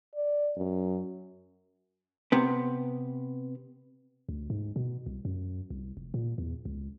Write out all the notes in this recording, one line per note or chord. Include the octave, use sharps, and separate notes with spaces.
D5
F#2
C3 B3
D2
G#2
B2
C2
F#2
C2
F1
A#2
E2
C#2